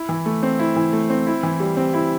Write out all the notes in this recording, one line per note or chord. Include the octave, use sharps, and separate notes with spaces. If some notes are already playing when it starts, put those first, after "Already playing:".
Already playing: E4
E3
A3
C4
E4
E3
A3
C4
E4
E3
G3
C4
E4